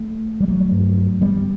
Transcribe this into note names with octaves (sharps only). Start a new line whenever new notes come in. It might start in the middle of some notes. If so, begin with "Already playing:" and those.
Already playing: A3
G3
F#3 A3
G2
G3 B3